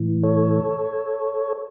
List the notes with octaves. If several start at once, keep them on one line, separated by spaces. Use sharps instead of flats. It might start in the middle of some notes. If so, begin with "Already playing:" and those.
Already playing: A2 E3
A4 C#5